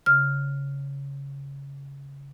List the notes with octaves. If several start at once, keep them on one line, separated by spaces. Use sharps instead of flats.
C#3 F6